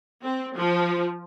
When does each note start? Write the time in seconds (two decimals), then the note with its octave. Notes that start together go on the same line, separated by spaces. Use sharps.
0.22 C4
0.56 F3